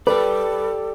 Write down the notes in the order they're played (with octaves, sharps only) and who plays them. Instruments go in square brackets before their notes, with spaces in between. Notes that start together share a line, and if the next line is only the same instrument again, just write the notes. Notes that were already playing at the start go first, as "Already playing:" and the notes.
[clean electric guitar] G4 D5 [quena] A4 [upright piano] B4